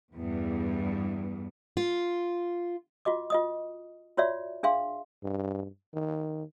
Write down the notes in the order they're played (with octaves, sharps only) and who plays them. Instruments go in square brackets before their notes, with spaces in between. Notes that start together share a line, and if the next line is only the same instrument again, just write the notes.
[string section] E2 G2
[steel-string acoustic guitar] F4
[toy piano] F4 F#4 D#5 D6
F4 D#5 D#6
F4 F#4 C#5 D5 E5
D4 G#4 E5 F5 C6
[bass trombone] G2
D#3